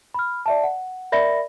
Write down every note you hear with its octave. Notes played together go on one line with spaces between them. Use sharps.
B5 F6
D5 E5 A5
F#5
A#4 D5 E5 B5 A#6